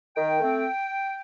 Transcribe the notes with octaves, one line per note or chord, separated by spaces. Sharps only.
D#3 G5
A3 C4